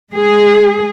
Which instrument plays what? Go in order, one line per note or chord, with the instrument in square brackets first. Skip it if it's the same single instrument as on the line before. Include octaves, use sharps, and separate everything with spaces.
[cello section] G#3 G#4